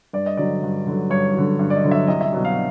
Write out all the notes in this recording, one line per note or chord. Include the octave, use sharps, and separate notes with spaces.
G2 D5
D#5
D3 F#3 D5
G2
D3 F#3
G2 C#5
D3 F#3
G2
D5
D#5
D3 F#3
E5
C2 D#5
E5
B2 F#3
F5